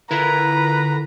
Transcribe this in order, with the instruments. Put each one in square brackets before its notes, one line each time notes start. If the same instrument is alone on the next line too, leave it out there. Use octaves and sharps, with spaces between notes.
[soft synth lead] D3 [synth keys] E4 F4 A#4 [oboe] B4 [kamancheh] A#5